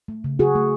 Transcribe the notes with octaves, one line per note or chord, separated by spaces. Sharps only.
A3
C#3
C#3 F#4 G#4
A3